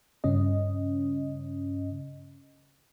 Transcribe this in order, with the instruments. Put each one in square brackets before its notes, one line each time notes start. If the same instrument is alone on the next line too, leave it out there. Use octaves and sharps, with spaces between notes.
[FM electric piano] G2 C#3 C#4 D#5